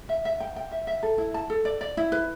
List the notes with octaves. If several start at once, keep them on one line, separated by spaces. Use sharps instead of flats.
E5
E5
G5
G5
E5
E5
A4
E4
A5
A4
D5
D5
E4
B4